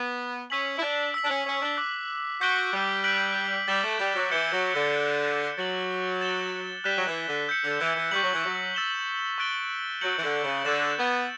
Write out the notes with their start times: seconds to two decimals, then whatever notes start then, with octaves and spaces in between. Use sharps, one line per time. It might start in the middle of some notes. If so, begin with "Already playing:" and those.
Already playing: B3
0.50 C#4 E6 B6 F#7
0.77 E4
0.82 D4
1.14 E6 B6 F#7
1.25 D4
1.29 C#4
1.46 C#4
1.62 D4
1.77 D6 F#6 B6
2.41 F#4 G6 B6 D7 G7
2.73 G3
3.04 F#6 B6 D7 F#7
3.68 G3 D6 A6 E7 G7
3.84 A3
3.99 G3
4.16 F#3
4.31 E3 D6 G6 C#7 E7 G7
4.52 F#3
4.74 D3
4.94 F#6 C#7 G7
5.58 F#3 A6 C#7 F#7
6.21 A6 E7 G7
6.84 G3 F#6 B6 E7 G7
6.97 F#3
7.06 E3
7.27 D3
7.48 E6 G6 C#7
7.64 D3
7.80 E3
7.96 E3
8.11 G3 C#6 G6 B6 F#7
8.23 F#3
8.34 E3
8.45 F#3
8.74 E6 A6 E7 G7
9.38 C#6 F#6 A6 D7 G7
10.01 F#3 G6 C#7 F#7
10.18 E3
10.23 D3
10.44 C#3
10.65 D3 F#6 A6 E7
10.97 B3